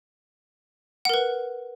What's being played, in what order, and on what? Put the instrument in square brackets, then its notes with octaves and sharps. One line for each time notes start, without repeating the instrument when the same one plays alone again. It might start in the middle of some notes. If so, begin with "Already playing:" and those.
[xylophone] F#5
A#4
B4